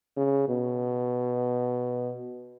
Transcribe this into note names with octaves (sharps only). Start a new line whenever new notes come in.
C#3
B2